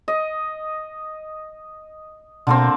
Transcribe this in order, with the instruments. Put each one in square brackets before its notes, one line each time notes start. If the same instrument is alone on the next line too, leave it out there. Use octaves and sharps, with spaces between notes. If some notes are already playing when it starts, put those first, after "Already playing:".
[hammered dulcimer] D#5
[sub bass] B2 [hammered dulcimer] D3 A#3 C4